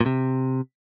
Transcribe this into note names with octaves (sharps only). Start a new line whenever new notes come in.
A#2
C3